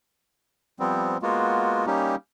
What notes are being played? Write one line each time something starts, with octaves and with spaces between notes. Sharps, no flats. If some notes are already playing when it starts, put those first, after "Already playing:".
F3 G3 B3 C4
G#3 A#3 B3 F4 F#4
G3 A#3 C#4 D#4 G4